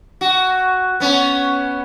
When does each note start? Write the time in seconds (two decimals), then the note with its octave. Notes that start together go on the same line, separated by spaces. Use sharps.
0.21 F#4
1.00 B3 C#4